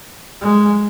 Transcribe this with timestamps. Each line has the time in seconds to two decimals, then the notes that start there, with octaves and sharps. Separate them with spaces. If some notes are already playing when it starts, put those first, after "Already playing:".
0.41 G#3